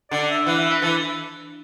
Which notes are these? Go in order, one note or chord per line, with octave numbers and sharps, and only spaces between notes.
D3 D5
E5
E3 F#5
E5
B4
E3 A4